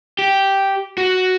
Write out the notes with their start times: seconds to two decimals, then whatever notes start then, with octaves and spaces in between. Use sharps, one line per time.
0.19 G4
0.98 F#4